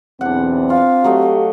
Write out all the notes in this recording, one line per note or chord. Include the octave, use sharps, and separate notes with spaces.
B1 E2 C4 D4 F#5
F4 F5
F#3 A3 G4 D#5